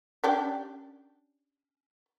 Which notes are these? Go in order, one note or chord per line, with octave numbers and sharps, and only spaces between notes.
C#4 D4 G4